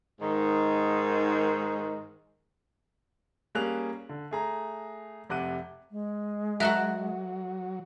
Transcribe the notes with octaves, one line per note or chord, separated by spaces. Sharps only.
G#2 D#3
G3 A#3 C#4 G#4 F#6 F7
D3
A3 G#4 A#5
F1 C3 F#5 D6 F#6 D#7
G#3
F#3 F#4 A4 A#4 E5 F#6